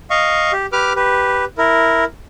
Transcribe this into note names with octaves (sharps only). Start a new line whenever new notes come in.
D#5 F5 C#6
G4
G4 B4 D6 F6
G4 B4
E4 A#4